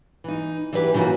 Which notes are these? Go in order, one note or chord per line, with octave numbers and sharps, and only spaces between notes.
E3 D#4
E3 F#3 D4 G4 B4
C#3 E3 F3 A#3 F#4